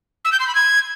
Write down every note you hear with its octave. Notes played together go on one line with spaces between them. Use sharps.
E6
G6
C6
B5
G#6